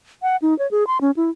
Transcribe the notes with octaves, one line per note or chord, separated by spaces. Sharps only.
F#5
D#4
C#5
G#4
C6
C#4
E4